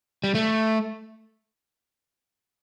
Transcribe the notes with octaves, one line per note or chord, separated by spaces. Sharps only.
G3
A3